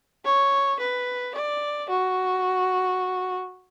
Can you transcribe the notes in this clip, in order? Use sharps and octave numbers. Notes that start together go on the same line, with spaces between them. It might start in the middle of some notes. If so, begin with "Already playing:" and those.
C#5
B4
D5
F#4